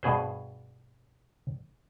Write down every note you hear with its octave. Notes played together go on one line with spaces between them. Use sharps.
G2 B2 G#4 C5